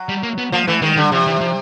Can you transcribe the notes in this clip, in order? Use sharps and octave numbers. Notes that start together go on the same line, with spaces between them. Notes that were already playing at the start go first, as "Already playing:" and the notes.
Already playing: F#3
G3
A#3
B3
F3 A#3
E3 A3
D#3 G#3
D3 G3
C3 F3
E3
F3